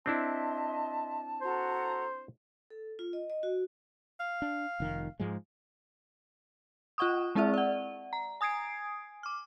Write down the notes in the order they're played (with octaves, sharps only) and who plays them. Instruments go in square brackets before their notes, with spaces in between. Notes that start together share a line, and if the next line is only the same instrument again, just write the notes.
[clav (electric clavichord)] C4 D4 E4 [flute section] D#5 E5 C6 [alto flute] A5
[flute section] F#4 A4 A#5 [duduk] C5
[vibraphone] A4
F4
D#5
D#5
F#4
[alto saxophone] F5
[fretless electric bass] D4
F1 D#3
G#2 F3 G#3
[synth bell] F4 D#5 F#5 C#6 D#6
G#3 C4 E4 G#4 D5 E5
D5 F#5
A#5
G#5 D#6 G#6 C7 D7
D6 F6